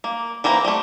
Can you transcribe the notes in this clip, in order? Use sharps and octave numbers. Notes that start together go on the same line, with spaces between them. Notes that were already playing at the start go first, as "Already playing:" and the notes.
A#3
E3 A#3 C4 A#5
G3 A3